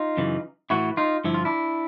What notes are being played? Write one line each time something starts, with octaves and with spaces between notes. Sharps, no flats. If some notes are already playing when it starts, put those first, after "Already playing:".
Already playing: D#4 F4
F#2 C#3 E3
A2 E3 E4 F#4
D#4 F4
G2 D3 F3 E4
F4
D4 E4